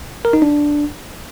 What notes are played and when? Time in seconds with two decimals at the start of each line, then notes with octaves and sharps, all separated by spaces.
0.25 A#4
0.33 D#4
0.42 D4